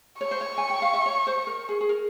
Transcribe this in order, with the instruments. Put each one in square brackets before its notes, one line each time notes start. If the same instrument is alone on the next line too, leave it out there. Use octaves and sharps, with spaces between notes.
[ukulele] C#5 [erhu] C#6
[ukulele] C5
C#5
G#5
G5
F5
E5
C#5
C5
A#4
G#4
G#4
A#4